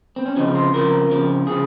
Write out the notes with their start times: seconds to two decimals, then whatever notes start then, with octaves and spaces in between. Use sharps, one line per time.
0.16 C4
0.26 C#4
0.36 C#3 F3 C4 D#4
0.55 C5
0.74 C#3 F3 C4 A#4
1.11 C#3 F3 C4
1.47 C#3 F3 C4 G#4